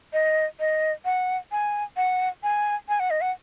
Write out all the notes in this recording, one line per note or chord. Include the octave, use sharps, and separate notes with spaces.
D#5
D#5
F#5
G#5
F#5
G#5
G#5
F#5
D#5
F#5